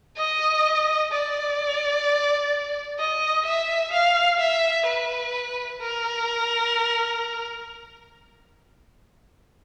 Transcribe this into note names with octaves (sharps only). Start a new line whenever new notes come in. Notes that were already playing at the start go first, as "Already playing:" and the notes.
D#5
D5
D#5
E5
F5
E5
B4
A#4